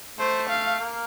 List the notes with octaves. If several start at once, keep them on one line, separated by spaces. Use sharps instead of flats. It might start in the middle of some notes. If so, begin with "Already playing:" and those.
A3 C5
F5
A#3